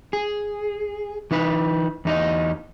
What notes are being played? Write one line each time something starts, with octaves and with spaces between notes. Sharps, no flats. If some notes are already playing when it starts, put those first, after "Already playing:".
G#4
E3 D#4 B4
E2 D#4 D#5